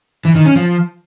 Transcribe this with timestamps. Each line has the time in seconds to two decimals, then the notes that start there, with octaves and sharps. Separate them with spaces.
0.25 E3
0.35 D#3
0.45 C#4
0.56 F3